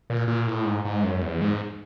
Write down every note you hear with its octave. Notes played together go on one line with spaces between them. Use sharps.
A#2
A#2
A2
G#2
G#2
F#2
E2
G#2